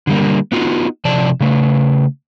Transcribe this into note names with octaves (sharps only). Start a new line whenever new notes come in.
D3 G3 A#3
B3 D#4 F4 F#4
C3 F3 D5 A5
C#3 A3